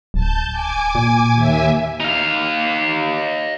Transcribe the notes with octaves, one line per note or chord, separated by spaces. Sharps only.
D1 A5 G6
G#5 D6 G#6
A#2
D#2 E5 G#5
D#4 F5